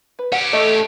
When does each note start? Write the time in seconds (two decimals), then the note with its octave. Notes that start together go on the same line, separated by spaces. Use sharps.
0.19 B4
0.32 C#4 G4 F#5
0.53 A3 D#5